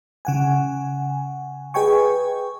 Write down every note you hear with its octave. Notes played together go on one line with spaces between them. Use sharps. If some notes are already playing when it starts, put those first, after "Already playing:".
C#3 F#5 G#5
G#4 B4 D#5 G5 G#5 C#6